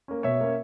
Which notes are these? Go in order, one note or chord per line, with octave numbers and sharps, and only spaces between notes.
A#3 C#4
B2 C#5 E5
A#3 C#4